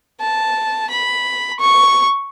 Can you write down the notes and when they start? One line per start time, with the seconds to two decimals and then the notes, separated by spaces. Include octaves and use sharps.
0.21 A5
0.90 B5
1.60 C#6